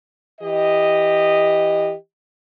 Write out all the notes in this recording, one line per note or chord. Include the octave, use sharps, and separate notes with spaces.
E3 G4 D#5